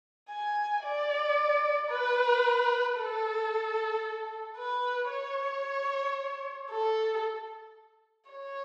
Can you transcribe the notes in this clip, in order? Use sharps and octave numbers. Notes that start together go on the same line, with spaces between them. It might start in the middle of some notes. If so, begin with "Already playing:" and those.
G#5
D5
B4
A4
B4
C#5
A4
C#5